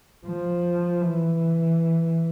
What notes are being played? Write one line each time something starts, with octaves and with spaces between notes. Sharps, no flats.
F3
E3